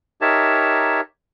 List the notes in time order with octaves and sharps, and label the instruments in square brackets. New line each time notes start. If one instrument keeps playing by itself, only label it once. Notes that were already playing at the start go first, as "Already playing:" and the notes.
[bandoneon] D#4 G4 A#4 C#5 E5 A5